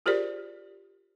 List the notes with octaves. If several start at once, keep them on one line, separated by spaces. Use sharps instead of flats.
F4 G4 G#4 A#4 C5 D5